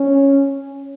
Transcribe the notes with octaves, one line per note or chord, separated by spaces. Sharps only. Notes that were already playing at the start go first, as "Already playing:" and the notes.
Already playing: C#4